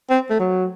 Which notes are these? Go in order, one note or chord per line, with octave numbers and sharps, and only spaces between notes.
C4
A3
F#3